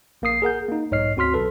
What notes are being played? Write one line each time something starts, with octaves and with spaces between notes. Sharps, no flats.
A#1 A#3 A#4 D#6 C7
G#4 A#4 F#5 G6
A#3 D#4
B1 G#2 C#5 D#5 F6 C7
D2 C4 F#4 C6 F6 B6
B1 A4 B4